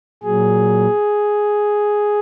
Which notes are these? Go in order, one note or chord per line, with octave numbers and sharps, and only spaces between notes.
A#2 F#3 G#4